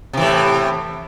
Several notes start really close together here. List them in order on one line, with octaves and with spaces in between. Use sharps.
C3 E3 A2